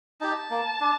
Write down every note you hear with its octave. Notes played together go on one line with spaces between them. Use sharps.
D#4 G4 A5
A#3
D4